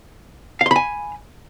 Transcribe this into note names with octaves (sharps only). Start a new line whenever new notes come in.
F5 G#5 B5 C6